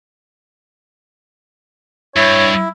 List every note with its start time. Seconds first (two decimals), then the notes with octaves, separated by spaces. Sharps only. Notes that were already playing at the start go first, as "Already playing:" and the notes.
2.16 G2 E4 C#5